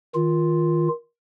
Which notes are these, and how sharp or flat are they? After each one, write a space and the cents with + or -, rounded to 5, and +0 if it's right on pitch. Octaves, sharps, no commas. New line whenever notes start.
D#3 +20 F4 +0